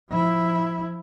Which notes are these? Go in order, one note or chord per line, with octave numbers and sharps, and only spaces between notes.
F3 E4